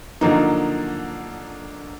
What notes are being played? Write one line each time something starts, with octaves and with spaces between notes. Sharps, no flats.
D3 F3 F#3 A#3 D#4